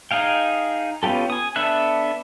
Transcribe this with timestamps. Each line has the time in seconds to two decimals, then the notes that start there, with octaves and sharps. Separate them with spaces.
0.11 D#4 G#4 F5 G5
1.03 B3 C#4 F4 G4 A4
1.30 G#5 D#6
1.56 B3 D4 A4 E5 F#6